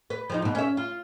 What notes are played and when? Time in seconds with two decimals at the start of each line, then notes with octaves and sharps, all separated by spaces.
0.10 B4
0.30 F3 G3 D#4
0.42 G#2 B2
0.55 C#4 E5
0.77 F4